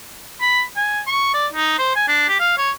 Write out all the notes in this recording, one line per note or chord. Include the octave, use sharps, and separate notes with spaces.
B5
G#5
C#6
D5
D#4
C5
G#5
D4
G4
F5
C#5